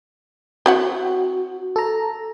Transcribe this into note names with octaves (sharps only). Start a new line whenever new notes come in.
C4 E4 F#4 F#5
A4 A#5